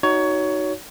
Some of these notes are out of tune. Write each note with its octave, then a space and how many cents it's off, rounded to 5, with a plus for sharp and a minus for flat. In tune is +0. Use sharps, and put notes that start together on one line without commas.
D#4 -5 F#4 +10 C#5 +20